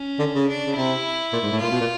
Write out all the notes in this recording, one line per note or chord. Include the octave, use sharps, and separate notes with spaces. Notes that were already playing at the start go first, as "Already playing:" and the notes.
Already playing: C#4
D3
C#3
D4
C#3
C3 E4
A#2
G#2
A2
A#2 F4
B2
A#2